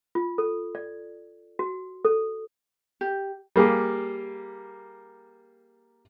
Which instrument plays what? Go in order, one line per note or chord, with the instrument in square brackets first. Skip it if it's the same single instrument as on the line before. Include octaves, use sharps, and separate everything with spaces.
[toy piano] F4
A4
D5
F#4
A4
[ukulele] G4
[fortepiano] G3 A#3 G4 G#4